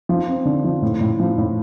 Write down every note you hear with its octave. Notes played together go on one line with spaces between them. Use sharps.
F3
C4
D3
F3
A2
A2
F3
A2